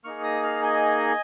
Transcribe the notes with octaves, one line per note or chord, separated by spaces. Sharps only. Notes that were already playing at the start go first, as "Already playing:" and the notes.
A#3 D#4 G#4 C#6 F6
A#5 D#6
F5 A#5
D#5 G#5